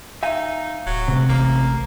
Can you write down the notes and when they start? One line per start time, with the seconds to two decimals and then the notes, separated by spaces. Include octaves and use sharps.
0.23 D#4 E5 F5 G#5
0.87 D1 F#3
1.08 C3 A3
1.29 A1 A#3